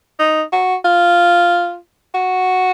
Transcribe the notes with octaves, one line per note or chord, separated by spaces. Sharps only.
D#4
F#4
F4
F#4